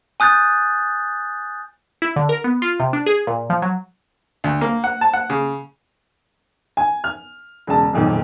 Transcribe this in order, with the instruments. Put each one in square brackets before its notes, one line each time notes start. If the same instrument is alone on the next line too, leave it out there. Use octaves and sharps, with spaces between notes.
[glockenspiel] G#5 D#6 F#6 G6 A6
[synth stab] E4
D3
A#4
B3
F4
C3
D4
G#4
A#2
F3
F#3
[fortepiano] D2
A#3
F#5
A5
F#5
C#3
[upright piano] G#5
F6
E1 C#3 A5
F#1 B1 F2 A#2 D#3